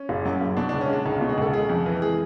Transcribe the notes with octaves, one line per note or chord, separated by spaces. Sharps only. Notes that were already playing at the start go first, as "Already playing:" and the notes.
Already playing: C#4
F#1
F#2
F#1
B2 D4
D4
C#2
C#4
G#3 D4
C#2 D#4
B2 F4
G#4
C#2 A4
C#3 G#4
F2
E3
G#3 G#4